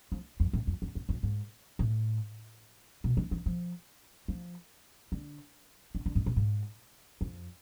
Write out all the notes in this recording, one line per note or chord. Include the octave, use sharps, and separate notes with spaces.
F3
F2
A2
F2
E2
E2
F2
G#2
A2
B2
E3
E3
F3
F3
D3
D3
D3
G#2
A2
G#2
F2